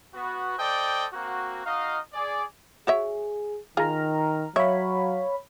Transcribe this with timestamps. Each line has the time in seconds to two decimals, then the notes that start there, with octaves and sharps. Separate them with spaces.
0.14 B3 F#4
0.57 A4 C5 D5 D#5 G5
1.12 A#3 C4 F#4
1.65 D#4 F#4 D#5 F5
2.13 G#4 D5
2.87 F#4 G#4 C#5 E5
3.77 D#3 F4 G#4 A#5 F6
4.56 F#3 C#5 E5 F5 B5